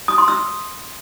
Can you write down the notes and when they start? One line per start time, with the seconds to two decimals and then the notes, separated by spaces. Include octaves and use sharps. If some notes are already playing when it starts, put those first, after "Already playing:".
0.08 D#6
0.18 C6
0.28 E6